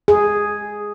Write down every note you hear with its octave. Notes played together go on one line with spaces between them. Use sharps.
G#4